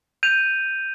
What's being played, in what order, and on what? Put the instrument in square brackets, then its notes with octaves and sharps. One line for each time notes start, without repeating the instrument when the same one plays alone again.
[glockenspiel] G6 D#7 F7